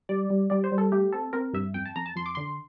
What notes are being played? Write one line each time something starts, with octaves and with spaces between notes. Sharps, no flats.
G3 D5
G3
G3 D5
C5
G3
A4
A3 G4
C4 A4
C4 A#4
G2 E5
F2 G5
A5
F2 A#5
A5
F2 C6
D6
D3 C6